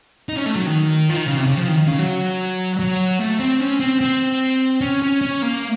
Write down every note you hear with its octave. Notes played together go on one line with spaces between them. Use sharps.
D#4
C#4
A3
F#3
D#3
F3
D#3
C#3
C3
C#3
F3
D#3
D#3
C#3
F#3
F#3
A3
C4
C#4
C4
C4
C#4
C#4
C#4
A#3